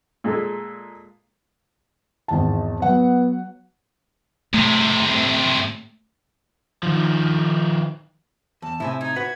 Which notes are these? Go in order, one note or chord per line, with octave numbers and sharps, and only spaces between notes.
A#2 G#3 A4
G#1 E2 A5
F#3 B3 F#5
A2 C3 A3
D#3 F3
E2 A5
A2 C3 E4 G#5
D#4 G#6
F#4 B4